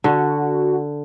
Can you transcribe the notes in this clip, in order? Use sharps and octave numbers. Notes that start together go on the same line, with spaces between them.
D3 F#4